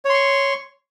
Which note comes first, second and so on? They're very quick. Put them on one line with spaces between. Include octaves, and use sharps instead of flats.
C#5 C6 C#6